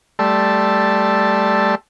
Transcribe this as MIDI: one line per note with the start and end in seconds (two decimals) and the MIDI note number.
0.19 1.75 55
0.19 1.75 57
0.19 1.75 74
0.19 1.75 81
0.19 1.75 84
0.19 1.75 88